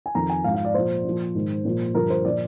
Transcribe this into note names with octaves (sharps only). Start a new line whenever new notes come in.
G#5
F2 D#3 A#5
G#5
G#2 F3 F5
F5
D5
A#2 F3 C5
A#2 F3
G#2 D#3
A#2 F3
G2 D3 F3 A#4
C5
A#2 F3 D5